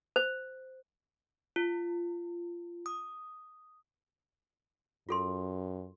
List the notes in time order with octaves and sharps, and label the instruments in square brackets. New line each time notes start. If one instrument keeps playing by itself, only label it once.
[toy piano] C5
[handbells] F4
D#6
[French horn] F#2 [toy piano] F4 A4 C6